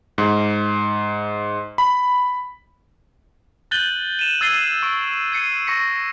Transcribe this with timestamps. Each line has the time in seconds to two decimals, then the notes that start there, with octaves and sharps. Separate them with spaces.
0.18 G#2
1.78 B5
3.71 F#6 G6 A6 D#7 F#7 G7
4.19 D#7 E7
4.41 E6 G#6 A6 C7 D#7 G7
4.83 C#6 D7
5.32 G#6 C7 C#7 D#7
5.67 C#6 A#6 B6 C#7